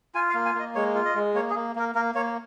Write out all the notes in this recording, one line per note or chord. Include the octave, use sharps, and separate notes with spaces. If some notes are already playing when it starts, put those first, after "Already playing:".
F4 G#5
F5
A#3
G#5
A#3 D#5
G#3 C#5
F4
D#5
G#3
A#3 C#5
G#4
A#3
A#3 A#4
A#3 A#4
A#3 C#5